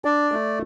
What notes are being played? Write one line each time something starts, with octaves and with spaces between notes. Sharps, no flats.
D4 D5
A3